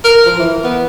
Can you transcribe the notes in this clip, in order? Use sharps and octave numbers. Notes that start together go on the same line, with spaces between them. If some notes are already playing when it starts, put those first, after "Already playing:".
A#4
F3
E3
B3